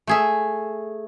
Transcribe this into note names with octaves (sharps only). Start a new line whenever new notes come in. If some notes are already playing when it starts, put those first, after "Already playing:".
A3 G#4 E5